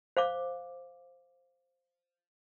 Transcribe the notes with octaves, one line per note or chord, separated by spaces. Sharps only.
C5 F5 D6